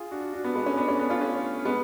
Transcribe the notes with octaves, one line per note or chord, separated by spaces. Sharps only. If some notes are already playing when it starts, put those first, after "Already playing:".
Already playing: F4 G#4
D4 F#4
D4 F#4
B3 D4
G#3 B3
A3 C#4
B3 D4
A3 C#4
B3 D4
C#4 F4
A3 C#4
G#3 B3